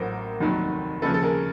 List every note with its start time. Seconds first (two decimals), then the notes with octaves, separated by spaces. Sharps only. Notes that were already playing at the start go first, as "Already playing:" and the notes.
Already playing: A1 A2 F#3 A#4 C5
0.40 F1 D#2 D#3 F#3
1.02 D#2 C#3 F3 A4 B4
1.14 A4
1.23 G#4 A#4